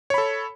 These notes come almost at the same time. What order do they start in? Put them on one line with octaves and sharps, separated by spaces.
C#5 B5 A4